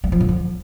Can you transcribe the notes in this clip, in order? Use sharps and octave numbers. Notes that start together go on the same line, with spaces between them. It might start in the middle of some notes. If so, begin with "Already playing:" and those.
G3
F3
D3
F3